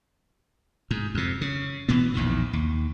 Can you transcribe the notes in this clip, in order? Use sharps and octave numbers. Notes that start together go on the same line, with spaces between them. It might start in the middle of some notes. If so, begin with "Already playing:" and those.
G#2
F2 C3
C#3
B2 E3 B3
A#1 E2 A#2 D#3
D#2